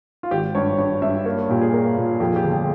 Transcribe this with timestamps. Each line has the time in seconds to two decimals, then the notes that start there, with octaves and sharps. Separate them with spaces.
0.23 F4
0.31 G#1 G4
0.55 G2 C#5
0.78 G2 C#5
1.02 G2 E5
1.25 A#3 C#5
1.49 A#2 G4
1.62 G#4
1.73 A#3 A#4
1.97 A#2
2.20 F2 G4
2.31 G#4
2.36 G4
2.44 G1
2.52 G#4